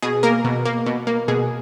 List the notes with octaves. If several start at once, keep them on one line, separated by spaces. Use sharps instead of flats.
B2 G#4
A#3 A#4
B2
A#3
B2
A#3
B2 G#4